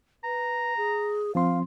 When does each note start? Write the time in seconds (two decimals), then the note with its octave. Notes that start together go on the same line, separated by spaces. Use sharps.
0.24 B4 A#5
0.77 G#4
1.35 F3 C4 F5 C6